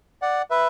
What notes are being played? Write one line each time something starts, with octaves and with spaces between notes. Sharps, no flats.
D5 F#5
B4 E5